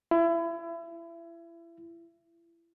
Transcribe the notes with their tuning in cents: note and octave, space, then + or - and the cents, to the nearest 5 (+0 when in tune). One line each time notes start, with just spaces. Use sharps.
E4 +30